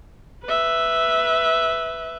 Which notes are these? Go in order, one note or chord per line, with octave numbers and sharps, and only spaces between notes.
B4 E5